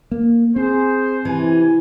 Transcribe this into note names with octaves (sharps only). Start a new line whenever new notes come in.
A#3
C4 G#4 C5
C3 E3 G#5